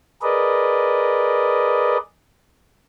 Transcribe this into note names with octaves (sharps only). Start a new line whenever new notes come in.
G#4 A#4 B4 D5 D#5